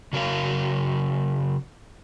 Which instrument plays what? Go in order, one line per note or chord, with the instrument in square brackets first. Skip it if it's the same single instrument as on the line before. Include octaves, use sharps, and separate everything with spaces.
[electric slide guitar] C#3 F#3 A#4 F5